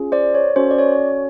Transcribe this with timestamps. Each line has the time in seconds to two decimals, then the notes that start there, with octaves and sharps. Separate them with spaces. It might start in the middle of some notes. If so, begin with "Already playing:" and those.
Already playing: C#4 F4 G#4
0.12 C5 D5
0.34 C#5
0.56 C#4 F#4 A4 C5
0.71 D5
0.78 C#5